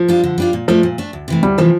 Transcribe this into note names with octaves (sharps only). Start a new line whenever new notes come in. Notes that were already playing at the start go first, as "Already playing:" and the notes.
Already playing: F3
G3 D4 F4
D3
G3 D4 F4
A#2
F3 A3 D4
A#2
A3 D4
D2
C3 E3 A3
D2 G3
C3 E3 F3 A3